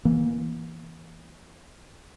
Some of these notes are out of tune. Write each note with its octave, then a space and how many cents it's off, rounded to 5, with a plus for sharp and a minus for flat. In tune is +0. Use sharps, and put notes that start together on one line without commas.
E3 +0 A#3 +20